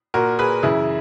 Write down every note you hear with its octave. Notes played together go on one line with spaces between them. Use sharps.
A#2 F#4 A#4
G#4 B4
F#2 C#3 E3 E4 G#4